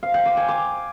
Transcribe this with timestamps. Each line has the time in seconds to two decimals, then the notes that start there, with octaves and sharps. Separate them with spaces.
0.03 F5
0.14 G5
0.26 D6
0.37 G#5
0.48 D6